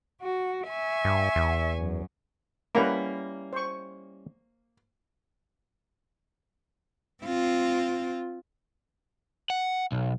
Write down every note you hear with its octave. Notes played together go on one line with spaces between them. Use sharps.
F#4
E5 G#5 C#6
G2
E2
F#2
G3 A#3 C#4 E4 B4 F#5 A#5
C5 C#6
C4 F4
F#5
B1